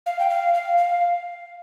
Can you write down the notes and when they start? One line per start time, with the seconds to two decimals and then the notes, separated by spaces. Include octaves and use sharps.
0.06 F5
0.19 G5
0.30 F5
0.54 F5
0.78 F5